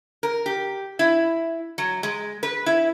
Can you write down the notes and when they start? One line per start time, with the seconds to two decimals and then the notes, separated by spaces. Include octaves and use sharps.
0.23 A#4
0.46 G4
0.99 E4
1.78 F#3
2.03 G#3
2.43 B4
2.66 E4